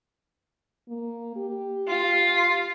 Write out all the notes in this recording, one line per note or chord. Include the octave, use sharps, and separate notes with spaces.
A#3
G4
F4